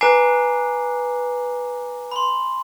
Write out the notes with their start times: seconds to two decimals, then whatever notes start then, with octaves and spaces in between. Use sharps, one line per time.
0.01 B4 G#5 A#5 D6 C7
2.11 B5 C6